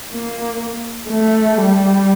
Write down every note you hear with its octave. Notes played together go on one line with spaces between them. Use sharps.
A#3
A3
G3